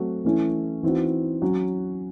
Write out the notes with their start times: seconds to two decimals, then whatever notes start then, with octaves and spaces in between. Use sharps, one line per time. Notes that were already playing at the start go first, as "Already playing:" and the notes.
Already playing: F#3 A3 C4 F#4
0.25 E3 A3 C#4 E4
0.83 E3 C4 D#4 F#4
1.42 F#3 C#4 F#4